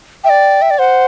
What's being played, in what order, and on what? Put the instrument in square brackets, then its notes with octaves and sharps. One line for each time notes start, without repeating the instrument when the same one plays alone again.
[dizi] E5 [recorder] G5
[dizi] D5
E5
D5
[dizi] C5 [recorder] F#5